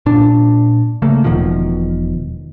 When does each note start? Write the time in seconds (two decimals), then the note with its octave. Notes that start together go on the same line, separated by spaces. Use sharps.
0.06 A#2 D4
1.02 C#3 A3 A#3
1.24 E1 B2 D#3 F3